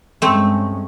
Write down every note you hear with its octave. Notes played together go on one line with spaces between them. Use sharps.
G2 G#3 A3 C4 C#4